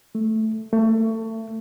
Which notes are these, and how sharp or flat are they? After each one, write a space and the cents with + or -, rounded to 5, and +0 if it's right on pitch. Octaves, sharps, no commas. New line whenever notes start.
A3 -5
A3 +25